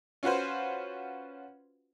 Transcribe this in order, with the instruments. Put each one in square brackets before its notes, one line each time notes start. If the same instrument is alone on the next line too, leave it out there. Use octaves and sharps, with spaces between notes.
[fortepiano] C#4 F4 F#4 B4 C5